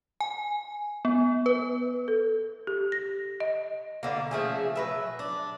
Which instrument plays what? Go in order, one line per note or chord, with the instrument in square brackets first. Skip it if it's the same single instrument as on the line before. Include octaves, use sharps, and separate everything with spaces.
[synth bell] G#5
B3
B4
[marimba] A4
G4
A#6
D#5
[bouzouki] B2 D3 A#3
C#3 F3 A3 G#4
F#3 B4 E5
D4